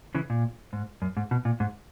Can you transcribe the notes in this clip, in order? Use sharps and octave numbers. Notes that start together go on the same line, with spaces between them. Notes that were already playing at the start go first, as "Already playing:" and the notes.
C#3 E3
A#2
G#2
F#2
G#2
B2
A#2
G#2